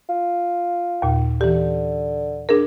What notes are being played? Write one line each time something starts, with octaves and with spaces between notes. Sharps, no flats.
F4
D#2 A#2
D3 E3 G4
D4 G#4 A#4